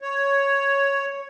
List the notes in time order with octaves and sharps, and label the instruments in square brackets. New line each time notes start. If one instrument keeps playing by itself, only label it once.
[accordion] C#5